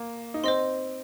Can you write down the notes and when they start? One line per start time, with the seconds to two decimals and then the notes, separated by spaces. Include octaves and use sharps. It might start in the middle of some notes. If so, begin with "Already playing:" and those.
Already playing: A#3
0.34 D#4
0.44 C4 C5 D#5 C6